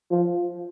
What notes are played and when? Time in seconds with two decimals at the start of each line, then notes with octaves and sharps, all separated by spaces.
0.11 F3